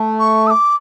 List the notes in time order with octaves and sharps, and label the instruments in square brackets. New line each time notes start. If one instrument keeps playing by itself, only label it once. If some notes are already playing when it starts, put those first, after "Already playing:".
Already playing: [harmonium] A3
[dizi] C#6
E6
D6